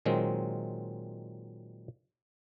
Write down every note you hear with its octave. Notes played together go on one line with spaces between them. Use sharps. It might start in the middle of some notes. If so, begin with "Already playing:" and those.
A#2 D#3 F#3 G#3 C4